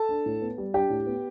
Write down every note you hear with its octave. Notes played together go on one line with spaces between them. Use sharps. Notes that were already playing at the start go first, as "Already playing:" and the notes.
Already playing: A4 A5
D4
A2
B3
G3
D4 G4 G5
A2
B3